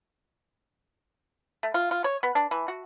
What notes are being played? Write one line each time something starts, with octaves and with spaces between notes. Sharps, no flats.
A3
F4
F4
C#5
B3
D4
E3
F#4